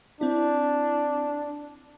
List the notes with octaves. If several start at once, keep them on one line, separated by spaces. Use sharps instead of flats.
C4 D4 E4